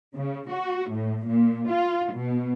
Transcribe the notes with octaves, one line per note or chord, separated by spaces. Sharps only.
C#3
F#4
A2
A#2
F4
B2